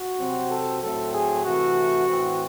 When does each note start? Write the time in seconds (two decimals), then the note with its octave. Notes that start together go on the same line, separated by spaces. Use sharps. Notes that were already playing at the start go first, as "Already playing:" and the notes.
Already playing: F#4
0.19 C3 F#3 C4
0.50 A4
0.82 A2 F#3 A3 C4 A4
1.13 G#4
1.44 C3 E3 A3 F#4
2.08 A2 E3 C4